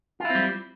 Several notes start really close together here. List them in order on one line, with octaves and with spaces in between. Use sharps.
F4 E4 C4 G3